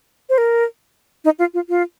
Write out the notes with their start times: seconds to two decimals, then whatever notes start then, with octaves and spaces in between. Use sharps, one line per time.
0.29 C5
0.38 A#4
1.24 D#4
1.39 F4
1.54 F4
1.69 F4